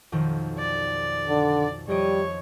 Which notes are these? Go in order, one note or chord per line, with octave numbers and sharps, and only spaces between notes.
B1 F2 D#3
D5
D3
F2 G3 C#5 D#5 D7